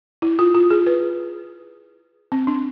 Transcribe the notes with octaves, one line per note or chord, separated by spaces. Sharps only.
E4
F4
F4
G#4
B4
C4
D4